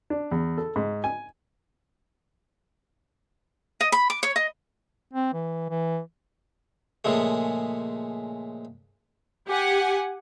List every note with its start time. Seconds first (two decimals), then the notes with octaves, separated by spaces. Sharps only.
0.10 D4
0.31 E2
0.58 A4
0.76 G#2
1.04 G#5
3.81 D#5
3.92 B5
4.10 D6
4.23 C#5
4.36 D#5
5.13 C4
5.33 E3
5.70 E3
7.05 A#2 C#3 F3 G#3 A3
9.49 G4 F#5 G#5